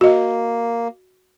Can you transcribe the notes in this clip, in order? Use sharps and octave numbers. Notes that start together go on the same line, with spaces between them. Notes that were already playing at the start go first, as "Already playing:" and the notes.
A#3 F#4 D#5